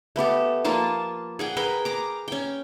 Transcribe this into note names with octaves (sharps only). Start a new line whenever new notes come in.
A3 B3 G4 A4
F3 A#3 F4 A5
G#4 F#5 G5
G#4 A#4 B4 G5
A#5 D6
C#4 G5